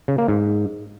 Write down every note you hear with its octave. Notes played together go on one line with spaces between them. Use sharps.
C#3
A#3
G#2